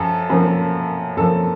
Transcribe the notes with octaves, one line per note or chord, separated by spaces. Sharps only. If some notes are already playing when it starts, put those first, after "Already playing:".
Already playing: F#2 F3 A4
F#2 F3 A#3
F#2 F3 A#3 A4